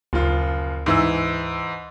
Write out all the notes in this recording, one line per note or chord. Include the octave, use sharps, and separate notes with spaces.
F#1 D2 F3 F4
G#2 E3 E6